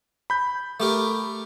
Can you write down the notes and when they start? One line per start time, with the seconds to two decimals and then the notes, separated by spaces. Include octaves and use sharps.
0.30 B5 G6
0.80 A3 G4 A#4